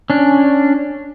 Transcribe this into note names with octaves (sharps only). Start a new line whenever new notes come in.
C#4 D4